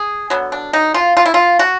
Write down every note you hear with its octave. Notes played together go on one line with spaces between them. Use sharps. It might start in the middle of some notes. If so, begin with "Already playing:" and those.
Already playing: G#4
D3 F#3 B3
D4
D#4
F4
F4
E4
F4
F#4